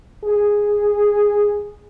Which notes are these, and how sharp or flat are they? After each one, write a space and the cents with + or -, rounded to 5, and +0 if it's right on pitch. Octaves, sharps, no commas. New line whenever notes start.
G#4 -5